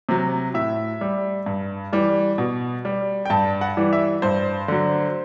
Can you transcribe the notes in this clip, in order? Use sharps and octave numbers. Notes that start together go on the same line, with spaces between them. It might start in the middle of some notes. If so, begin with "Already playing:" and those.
C3 F#3
A2 E5
G3
G2
E3 G3
B2
G3
G5
G2 A5
F#5
E3 G3
E5
G2 C5
D3 F#3